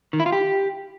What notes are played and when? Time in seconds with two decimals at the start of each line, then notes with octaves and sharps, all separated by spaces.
0.13 D#3
0.20 E4
0.26 F4
0.32 G4